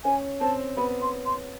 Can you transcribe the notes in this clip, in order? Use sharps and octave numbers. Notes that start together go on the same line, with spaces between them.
C#4 G#5
C4 A5
B3 B5
C6
C6